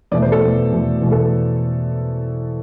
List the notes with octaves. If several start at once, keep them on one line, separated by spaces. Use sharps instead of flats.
E2 B2 A3 D5
C5
A4
E2 B2 A3
E2 B2 A3
E2 B2 A3
A4